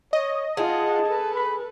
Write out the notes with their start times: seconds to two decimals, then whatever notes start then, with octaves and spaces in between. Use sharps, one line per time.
0.13 C#5 D#5
0.57 F4 G#4 F#5 A5
1.06 A4 B4
1.35 B5